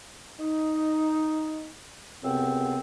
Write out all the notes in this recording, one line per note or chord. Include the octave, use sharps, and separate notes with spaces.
D#4
C#2 F#2 C3 B3 C4